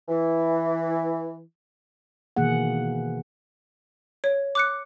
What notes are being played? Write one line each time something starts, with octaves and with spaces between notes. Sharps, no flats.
E3
B2 D#3 E3 A#3 G#4 F#5
C#5
D6 F#6 C#7